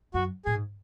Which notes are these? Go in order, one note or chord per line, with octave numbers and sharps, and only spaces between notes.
F#2 F#4
A2 G#4
G#2